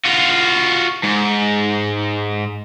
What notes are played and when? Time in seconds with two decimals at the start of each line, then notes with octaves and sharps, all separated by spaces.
0.06 F4 F#4
1.03 G#2